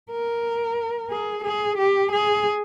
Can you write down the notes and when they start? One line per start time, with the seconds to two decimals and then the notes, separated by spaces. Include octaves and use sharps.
0.11 A#4
1.11 G#4
1.45 G#4
1.78 G4
2.12 G#4